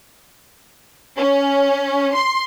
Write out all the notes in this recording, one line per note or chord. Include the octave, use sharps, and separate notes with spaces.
C#4
C6